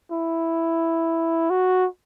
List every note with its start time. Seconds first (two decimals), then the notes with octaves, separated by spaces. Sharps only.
0.11 E4
1.50 F#4